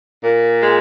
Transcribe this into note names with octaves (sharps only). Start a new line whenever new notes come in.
A#2
G#3